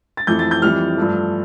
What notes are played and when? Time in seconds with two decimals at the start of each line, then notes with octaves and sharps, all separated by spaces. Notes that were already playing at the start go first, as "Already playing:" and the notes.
0.17 A6
0.27 F2 E3 A3 G6
0.39 A6
0.51 G6
0.62 F2 E3 G3 F6
0.97 G2 F3 A3